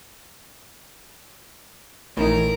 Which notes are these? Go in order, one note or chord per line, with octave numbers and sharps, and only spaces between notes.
A#1 A2 E3 D#4 A#4